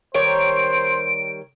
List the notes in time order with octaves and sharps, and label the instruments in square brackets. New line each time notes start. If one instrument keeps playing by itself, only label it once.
[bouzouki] D#3 G3 C#5 [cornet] C5 [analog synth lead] D7